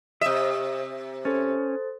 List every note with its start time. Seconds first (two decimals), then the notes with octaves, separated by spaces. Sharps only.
0.21 C3 D#5 E5
1.25 C#4 A4 C5 A6